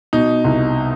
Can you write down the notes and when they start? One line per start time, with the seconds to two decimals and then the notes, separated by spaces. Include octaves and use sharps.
0.13 B2 D#4
0.44 C2